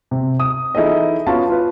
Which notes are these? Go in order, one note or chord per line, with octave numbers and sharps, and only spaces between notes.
C3
D#6
E3 D#4 E4 G#4 A4 D#5
B3 C#4 F4 F#4 F5 A5
F4 B4